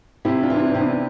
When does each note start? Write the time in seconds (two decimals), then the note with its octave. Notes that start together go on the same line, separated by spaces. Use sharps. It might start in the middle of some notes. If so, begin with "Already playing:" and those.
0.25 C3 E4 G4
0.43 D4 F4
0.50 E3
0.56 D4
0.62 C4 E4
0.73 C3 C4
0.81 B3 D4